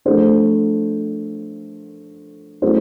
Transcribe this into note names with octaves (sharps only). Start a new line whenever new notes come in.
F3 A3 D4 C5
F#3 A3 C#4 E4 C5